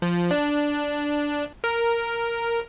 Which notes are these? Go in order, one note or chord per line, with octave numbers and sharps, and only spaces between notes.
F3
D4
A#4